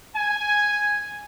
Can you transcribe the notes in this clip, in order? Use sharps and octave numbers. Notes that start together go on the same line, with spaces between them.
G#5